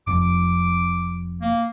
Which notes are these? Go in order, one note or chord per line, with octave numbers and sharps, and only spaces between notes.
F1 F2 D6
A#3